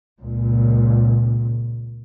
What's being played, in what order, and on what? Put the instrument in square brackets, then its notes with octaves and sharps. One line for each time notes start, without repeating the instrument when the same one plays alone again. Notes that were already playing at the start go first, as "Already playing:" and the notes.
[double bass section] C#2 A#2